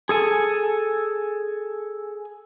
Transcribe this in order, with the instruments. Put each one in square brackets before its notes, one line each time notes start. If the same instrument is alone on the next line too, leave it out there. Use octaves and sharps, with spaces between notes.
[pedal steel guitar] G#4 A4 G#5